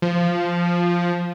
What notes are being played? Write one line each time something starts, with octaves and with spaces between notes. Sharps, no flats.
F3